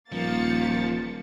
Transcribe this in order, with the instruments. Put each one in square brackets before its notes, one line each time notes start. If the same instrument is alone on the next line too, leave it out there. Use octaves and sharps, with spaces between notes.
[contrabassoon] D#1 [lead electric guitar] F3 [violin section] A#3 A6 C#7